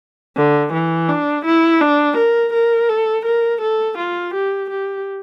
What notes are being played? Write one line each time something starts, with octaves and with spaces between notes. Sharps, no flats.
D3
E3
D4
E4
D4
A#4
A#4
A4
A#4
A4
F4
G4
G4